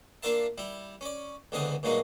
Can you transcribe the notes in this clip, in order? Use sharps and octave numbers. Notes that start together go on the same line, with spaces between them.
A#3 D4 F4 A#4 E5 A5
G3 E4
C#4 D5
C#2 D3 E3 B3 C4 D#5
G2 A#2 F#3 G#3 A#3 D#4